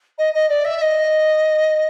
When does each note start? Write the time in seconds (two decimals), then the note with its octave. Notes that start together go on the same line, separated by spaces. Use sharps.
0.18 D#5
0.34 D#5
0.49 D5
0.64 E5
0.81 D#5